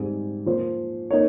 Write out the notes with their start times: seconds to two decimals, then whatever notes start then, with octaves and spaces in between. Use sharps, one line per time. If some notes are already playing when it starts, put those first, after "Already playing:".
Already playing: G#2 G3 C4 D#4 G#4
0.46 F3 A#3 F4 C5
1.11 A#3 D#4 A#4 C#5